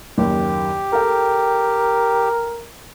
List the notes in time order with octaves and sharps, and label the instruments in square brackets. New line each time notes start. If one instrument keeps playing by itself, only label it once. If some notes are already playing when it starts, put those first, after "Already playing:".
[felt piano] F#1 D#2 D#3 [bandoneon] G4
[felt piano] A4 G5 [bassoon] A#4